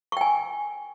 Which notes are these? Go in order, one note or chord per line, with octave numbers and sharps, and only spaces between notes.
G5 G#5 C#6